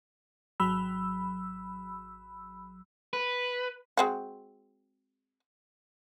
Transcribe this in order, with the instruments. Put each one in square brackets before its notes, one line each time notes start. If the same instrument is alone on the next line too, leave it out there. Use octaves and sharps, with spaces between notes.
[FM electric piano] G#1 F#3 B5 E6
[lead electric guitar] B4
[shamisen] G#3 C4 F#4